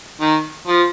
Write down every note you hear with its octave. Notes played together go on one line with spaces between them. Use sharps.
D#3
F3